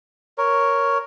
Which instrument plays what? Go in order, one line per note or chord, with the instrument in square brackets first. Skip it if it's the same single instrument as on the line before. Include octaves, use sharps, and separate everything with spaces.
[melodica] A#4 C#5